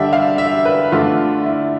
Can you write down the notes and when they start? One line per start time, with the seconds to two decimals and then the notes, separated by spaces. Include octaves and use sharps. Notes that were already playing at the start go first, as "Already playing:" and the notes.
Already playing: D3 G3 D4 E5
0.13 F5
0.38 E5
0.65 B4
0.92 D3 A3 D4 F4
1.45 E4